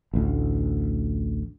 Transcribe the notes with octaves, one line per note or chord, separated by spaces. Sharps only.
A1 D2